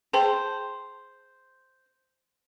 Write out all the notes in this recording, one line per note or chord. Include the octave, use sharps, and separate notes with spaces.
G#4 C5 G5 A5